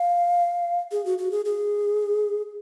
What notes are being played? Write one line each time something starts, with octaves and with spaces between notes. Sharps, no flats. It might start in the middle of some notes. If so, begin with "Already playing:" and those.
Already playing: F5
G#4
F#4
F#4
G#4
G#4